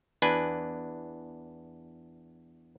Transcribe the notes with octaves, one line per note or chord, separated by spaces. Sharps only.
E2 D4 B4 G#5